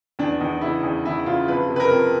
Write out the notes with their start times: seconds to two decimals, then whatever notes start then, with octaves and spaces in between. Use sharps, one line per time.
0.19 E2 D4
0.40 E2 D#4
0.61 C#3 E4
0.83 E2 D#4
1.05 E2 E4
1.26 C#3 F4
1.48 F2 B4
1.69 C3
1.76 B4
1.80 A#4
1.91 F2